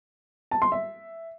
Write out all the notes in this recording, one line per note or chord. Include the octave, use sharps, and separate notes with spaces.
A5
C6
E5